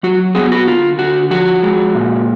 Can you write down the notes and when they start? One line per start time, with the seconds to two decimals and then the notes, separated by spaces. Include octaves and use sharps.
0.03 F#3 F#4
0.35 B3 F#4 G#4
0.52 F#4
0.67 D3 F4
0.99 D3 F#4
1.30 F3 F#4
1.63 G#3
1.95 A#2